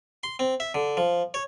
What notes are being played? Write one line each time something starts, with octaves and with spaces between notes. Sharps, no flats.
C6
C4
E5
D3
F3
C#5